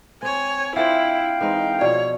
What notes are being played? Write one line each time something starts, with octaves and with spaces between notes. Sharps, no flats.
C4 C#5 G#5
D4 E4 F4 C5 E5 F5 G5
E3 G#3 C4 D#4
B2 F3 C#5 D5